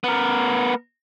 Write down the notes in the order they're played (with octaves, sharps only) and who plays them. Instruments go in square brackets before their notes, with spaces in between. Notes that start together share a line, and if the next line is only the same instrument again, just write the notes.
[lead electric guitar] B3 A#4